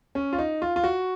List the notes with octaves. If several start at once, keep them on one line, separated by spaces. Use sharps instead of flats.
C#4
F4
D#4
F4
F4
F#4